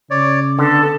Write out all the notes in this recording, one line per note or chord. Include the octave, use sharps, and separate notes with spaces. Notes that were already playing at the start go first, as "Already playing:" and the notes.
C#3 C#5 D5
D3 B3 A4